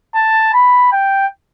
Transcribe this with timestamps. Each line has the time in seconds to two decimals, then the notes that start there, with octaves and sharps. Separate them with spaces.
0.15 A5
0.54 B5
0.92 G5